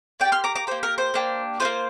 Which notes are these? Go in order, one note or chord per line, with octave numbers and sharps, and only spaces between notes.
A#3 D5 G5
G4
C6 F6
A#5 D6
A#5 D6
A#3 G4 C5
A#4
C5
A#3 D4 G4
D4 F4 C5
A#3